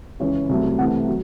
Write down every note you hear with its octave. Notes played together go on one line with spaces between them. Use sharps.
C#2 C#3 E3 C#5
C2 C3 F#3 A3
C2 C3 E3 A3 F#5
F#3